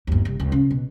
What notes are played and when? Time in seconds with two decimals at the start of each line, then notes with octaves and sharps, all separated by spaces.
0.07 G1 D#2
0.25 C2
0.40 C#2
0.52 C#3
0.71 B2